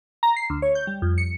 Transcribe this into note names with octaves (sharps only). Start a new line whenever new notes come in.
A#5
C7
D2
C#5
G6
G3
F2
C#7